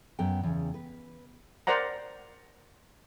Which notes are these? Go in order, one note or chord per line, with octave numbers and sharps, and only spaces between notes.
F#2 B3 G5
E2 C#3
B4
A#4 C5 D5 F#5 A#5